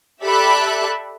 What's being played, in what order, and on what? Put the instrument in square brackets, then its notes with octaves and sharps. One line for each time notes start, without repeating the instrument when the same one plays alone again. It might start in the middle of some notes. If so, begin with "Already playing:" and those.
[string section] G4 A4 D5 E5 B5 F#6